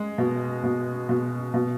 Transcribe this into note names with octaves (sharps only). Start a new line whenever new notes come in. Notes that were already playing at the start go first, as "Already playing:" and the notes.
Already playing: G#3
B2
B2
B2
B2